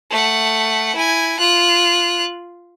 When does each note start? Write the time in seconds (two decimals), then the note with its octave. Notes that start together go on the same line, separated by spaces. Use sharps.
0.11 A3 F#5
0.95 E4 G#5
1.40 F4 F#6